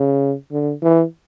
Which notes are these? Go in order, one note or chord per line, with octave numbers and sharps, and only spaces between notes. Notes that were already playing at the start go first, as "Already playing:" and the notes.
Already playing: C#3
D3
E3